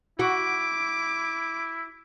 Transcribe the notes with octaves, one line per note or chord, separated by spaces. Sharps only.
E4 F#4 D6